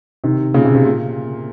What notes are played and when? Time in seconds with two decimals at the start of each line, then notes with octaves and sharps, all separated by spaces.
0.24 C3 D#3
0.54 A#2 C#3
0.65 C3
0.75 C3
0.85 A#2